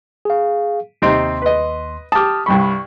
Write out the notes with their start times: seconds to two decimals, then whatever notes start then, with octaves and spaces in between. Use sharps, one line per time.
0.25 G#4 F5
1.02 D#2 C3 C4 D#4 C6
1.42 B4 D#5
2.12 G4 A5 D#6 F6
2.46 C2 G2 B5 C#6